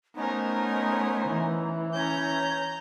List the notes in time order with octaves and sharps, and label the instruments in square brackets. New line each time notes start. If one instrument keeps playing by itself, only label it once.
[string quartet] A3 C#4 C5 [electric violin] B3 A#4 [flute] D#4
[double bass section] E3
[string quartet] C#4 [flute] C#5 [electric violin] A#5 G6